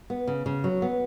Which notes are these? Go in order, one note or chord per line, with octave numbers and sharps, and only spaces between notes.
B3
C#3
C#3
F#3
B3